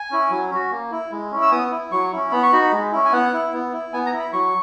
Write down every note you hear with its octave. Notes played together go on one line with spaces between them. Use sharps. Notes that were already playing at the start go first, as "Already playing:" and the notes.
Already playing: G#5
C#4 E4
F#3
C#4 F#4
A#3
E4
G#3
C#4 E4
E6
B3 D#6
E4
F#3 C#6
C#4 E4
B3 B5
C#6
D#4 F#4 B5
G#3
C#4 E4
G#5
B3 F#5
E4
B3
E4
B3 G#5
A#5
E4
B5
F#3 C#6